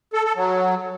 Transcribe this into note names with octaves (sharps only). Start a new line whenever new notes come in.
A4
A4
F#3